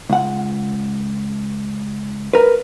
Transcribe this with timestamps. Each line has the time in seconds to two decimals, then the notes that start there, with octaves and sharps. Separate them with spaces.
0.10 C#2 F#5
2.33 A#4 B4